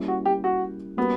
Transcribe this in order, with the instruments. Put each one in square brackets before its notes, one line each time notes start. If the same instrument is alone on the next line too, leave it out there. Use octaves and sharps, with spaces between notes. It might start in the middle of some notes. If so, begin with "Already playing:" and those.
Already playing: [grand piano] G3 A#3 C#4 E4
[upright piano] F#4
G4
F#4
[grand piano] G3 A#3 C#4 F#4 [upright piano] B3